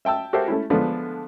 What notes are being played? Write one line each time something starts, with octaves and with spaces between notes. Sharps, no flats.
E5 G5 A5 E6
F#4 G4 A4 A#4 C5 E5
A3 C#4 E4
D3 F3 G#3 A3 B3 D4